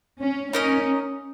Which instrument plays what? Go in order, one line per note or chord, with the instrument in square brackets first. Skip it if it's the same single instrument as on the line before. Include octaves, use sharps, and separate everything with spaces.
[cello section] C#4
[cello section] C#4 [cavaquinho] D#4 A#4 D#5